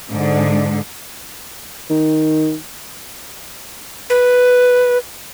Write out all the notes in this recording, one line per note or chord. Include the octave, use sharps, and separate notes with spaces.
G#2 D3
D#3
B4